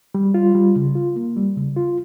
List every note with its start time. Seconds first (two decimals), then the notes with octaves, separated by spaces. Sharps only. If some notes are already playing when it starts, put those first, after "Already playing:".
0.15 G3
0.34 F4
0.55 G3
0.76 C#3
0.95 F4
1.16 A#3
1.36 G3
1.56 C#3
1.76 F4